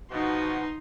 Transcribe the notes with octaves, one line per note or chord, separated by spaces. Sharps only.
B2 F3 D#4 F#4 C6